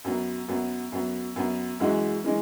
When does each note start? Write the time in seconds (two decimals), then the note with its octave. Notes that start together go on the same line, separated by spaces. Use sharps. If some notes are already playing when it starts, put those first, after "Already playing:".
0.04 F#2 F#3 B3
0.48 F#2 F#3 B3
0.92 F#2 F#3 B3
1.36 F#2 F#3 B3
1.80 F#2 E3 G#3 C#4 F#4
2.24 E3 G#3 C#4